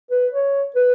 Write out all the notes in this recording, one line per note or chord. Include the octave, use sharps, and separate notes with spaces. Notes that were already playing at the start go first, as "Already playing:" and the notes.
B4
C#5
B4